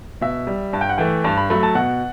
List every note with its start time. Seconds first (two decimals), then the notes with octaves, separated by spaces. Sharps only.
0.21 B2 E5
0.47 G3
0.73 G2 A5
0.81 G5
0.89 F#5
0.98 E3 A3 G5
1.24 G2 A5
1.37 B5
1.50 F#3 A3 B5
1.63 A5
1.75 B2 F#5